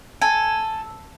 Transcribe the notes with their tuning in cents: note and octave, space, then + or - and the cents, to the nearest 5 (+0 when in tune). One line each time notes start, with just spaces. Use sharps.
A4 +0 G#5 +0